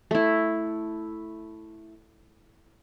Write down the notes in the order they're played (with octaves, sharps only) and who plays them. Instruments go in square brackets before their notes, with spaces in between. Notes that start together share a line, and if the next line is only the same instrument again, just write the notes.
[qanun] A3 E4